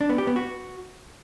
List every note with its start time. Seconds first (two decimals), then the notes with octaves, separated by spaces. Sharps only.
0.01 D4
0.09 B3
0.18 G4
0.27 B3
0.36 F#4